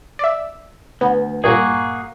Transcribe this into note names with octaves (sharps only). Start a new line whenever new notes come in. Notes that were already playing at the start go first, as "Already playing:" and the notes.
D5 E5
D2 B3
G2 A#2 A#3 F#4 G#4